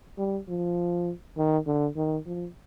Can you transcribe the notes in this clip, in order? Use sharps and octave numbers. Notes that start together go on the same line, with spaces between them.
G3
F3
D#3
D3
D#3
F3